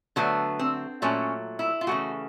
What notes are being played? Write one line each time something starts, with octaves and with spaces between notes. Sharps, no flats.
D3 F#3 A3 B3
C4
A#2 F#3 A3 C#4
E4
F4
C#3 E3 A3 F#4